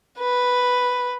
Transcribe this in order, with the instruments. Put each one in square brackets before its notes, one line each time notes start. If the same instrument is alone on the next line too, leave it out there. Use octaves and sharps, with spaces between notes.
[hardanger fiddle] B4